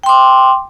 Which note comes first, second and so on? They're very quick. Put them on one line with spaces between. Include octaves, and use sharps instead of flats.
G5 C6 D6